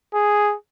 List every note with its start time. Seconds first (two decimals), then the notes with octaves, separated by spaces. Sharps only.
0.14 G#4